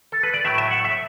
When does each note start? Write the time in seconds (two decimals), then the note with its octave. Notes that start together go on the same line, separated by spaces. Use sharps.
0.12 A4
0.23 B4
0.34 D5
0.44 A2 F#3 A3 E5
0.58 E5
0.71 F#5
0.84 E5